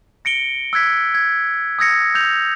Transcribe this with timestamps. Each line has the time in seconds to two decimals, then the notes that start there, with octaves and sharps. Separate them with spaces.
0.25 A#6 C#7 D7 G7
0.73 E6 F#6 G#6 B6
1.15 G#6
1.79 D#6 E6 G#6 A#6 C#7
2.15 E6 G6 F7